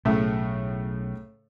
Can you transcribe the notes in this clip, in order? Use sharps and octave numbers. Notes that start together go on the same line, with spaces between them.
B1 A2 C#3 A3